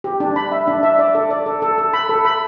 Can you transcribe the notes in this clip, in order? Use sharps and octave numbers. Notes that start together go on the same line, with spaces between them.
G4
D4
B5
E5
D4
E5
D5
A4
D5
A4
A4
A4
B5
A4
B5